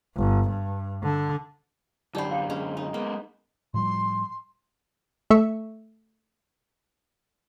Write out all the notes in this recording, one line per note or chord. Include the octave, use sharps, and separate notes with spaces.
G1
G2
D3
F#2 D3 D#4 G4 C5 D5 B5
F5 G5
G#3 C#4
D#4
G#3 A#3 B3
A2 F3 G3 C6
A3 E5 C#6